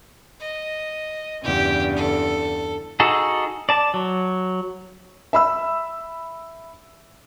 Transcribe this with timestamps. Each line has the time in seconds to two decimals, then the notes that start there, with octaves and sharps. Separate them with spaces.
0.40 D#5
1.43 E2 G2 C#3 G4
1.96 A4
3.00 D#4 F#4 G#4 A4
3.69 D5 A5
3.94 F#3
5.33 E5 B5 E6